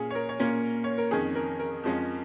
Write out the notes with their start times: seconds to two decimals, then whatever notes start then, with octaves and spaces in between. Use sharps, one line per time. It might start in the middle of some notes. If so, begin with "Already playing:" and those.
Already playing: A#2 A#3 C#4 G#4
0.11 C#5
0.15 A#4
0.29 C#5
0.40 A#2 A#3 C#4 A#4
0.84 C#5
0.98 A#4
1.11 F2 D#3 C#4 G#4
1.35 A#4
1.60 A#4
1.83 F2 F3 G#3 C#4